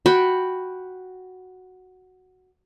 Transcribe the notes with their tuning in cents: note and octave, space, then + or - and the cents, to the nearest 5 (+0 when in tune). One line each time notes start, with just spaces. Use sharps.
F#4 +0 G5 +0 B5 +0